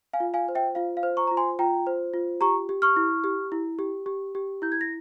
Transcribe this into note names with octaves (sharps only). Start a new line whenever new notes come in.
F5 G#5
F4
F5 G#5
C5
E5 G5
F4 F5
F5
C5
A#5 C#6
F4 A#5
G#5 C6
F4 G5 A#5
C5
F4
G4 A#5 C#6
G4
C#6 F6
E4
G4
E4
G4
G4
G4
E4 G6
G#6
A#6